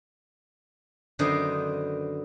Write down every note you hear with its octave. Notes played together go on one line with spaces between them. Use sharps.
F#2 D3 D#3 B3 C5 D#5